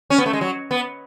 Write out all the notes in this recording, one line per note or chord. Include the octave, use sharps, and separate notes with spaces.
C#4
B3
A3
G#3
F#3
B3